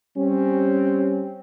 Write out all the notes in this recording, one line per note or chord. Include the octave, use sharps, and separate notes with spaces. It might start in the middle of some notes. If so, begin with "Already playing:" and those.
G3 C4 C#4